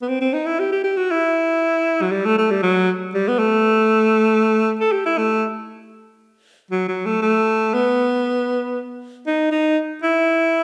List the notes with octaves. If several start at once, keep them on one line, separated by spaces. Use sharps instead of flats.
B3
C4
C4
D#4
E4
G4
G4
G4
F#4
E4
F#3
G3
A3
A3
G3
F#3
G3
B3
A3
A4
G4
E4
A3
F#3
F#3
A3
A3
B3
D#4
D#4
E4